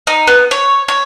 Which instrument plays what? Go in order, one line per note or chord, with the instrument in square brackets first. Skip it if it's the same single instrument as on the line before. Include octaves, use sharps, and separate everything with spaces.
[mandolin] D#4
B3
C#5
C#5